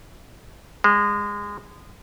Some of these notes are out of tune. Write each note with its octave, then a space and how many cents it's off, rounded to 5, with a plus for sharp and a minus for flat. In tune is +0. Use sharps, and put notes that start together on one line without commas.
G#3 -25